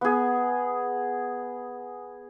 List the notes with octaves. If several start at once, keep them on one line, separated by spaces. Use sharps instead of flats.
B3 G#4